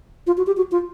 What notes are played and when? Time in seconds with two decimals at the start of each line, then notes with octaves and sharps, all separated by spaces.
0.27 F4
0.37 F#4
0.47 G4
0.57 F#4
0.71 F4